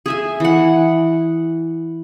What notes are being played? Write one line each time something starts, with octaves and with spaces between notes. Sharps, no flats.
G#4 E5 G#5
E3 F#5